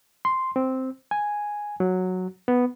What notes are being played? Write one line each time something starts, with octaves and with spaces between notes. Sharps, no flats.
C6
C4
G#5
F#3
B3